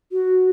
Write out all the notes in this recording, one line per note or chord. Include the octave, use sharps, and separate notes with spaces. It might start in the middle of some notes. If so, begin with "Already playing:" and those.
F#4